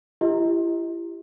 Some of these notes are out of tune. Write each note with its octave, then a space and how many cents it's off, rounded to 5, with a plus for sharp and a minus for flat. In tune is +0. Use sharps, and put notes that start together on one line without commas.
E4 +35 G4 +0 D#5 +30